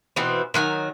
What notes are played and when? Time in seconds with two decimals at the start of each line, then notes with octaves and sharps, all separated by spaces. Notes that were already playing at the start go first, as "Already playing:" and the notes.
0.16 B2 E3 B3 C4
0.54 D#3 F#3 D5 G#5